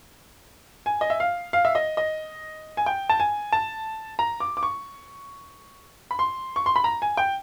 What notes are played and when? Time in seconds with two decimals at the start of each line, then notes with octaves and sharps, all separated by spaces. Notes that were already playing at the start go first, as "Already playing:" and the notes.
0.86 G#5
1.01 D#5
1.10 E5
1.20 F5
1.53 F5
1.65 E5
1.75 D#5
1.97 D#5
2.77 G#5
2.86 G5
3.10 A5
3.20 G#5
3.53 A5
4.19 A#5
4.40 D6
4.57 D6
4.63 C#6
6.11 B5
6.19 C6
6.56 C#6
6.66 C6
6.76 B5
6.84 A#5
7.02 G#5
7.17 G5